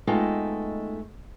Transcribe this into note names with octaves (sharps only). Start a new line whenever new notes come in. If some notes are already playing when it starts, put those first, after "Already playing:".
G#3 A3 B3 D#4 F4 G5